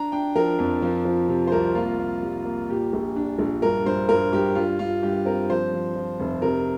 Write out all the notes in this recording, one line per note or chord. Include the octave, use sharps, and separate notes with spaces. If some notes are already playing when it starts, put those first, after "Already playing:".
Already playing: D4 A#5
D4 G5
F3 A#4
F2
F3
F3
C3
C5
C2 A#4
A#3 F4
A#3
G3
A#3
A#2 G4
A#1
D4
A#1
G2 A#4
G2 C5
G2 A#4
G2 G4
G3 F4
G2 F4
G2 G4
C4 A#4
F3 C5
F3
F3
F1
C3 A#4